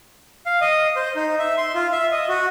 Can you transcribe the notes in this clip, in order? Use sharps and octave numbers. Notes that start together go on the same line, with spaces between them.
F5
D#5
C5
D#4
E5
C6
F4
E5
D#5
F#4